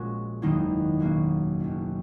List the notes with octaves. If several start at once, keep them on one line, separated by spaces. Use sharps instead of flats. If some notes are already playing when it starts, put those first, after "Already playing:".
Already playing: A#1 A#2 G#3 C#4 F#4
F#1 E2 D#3 A#3 D#4
B1 B2 A#3 C#4 F#4
F#1 F#2 D#3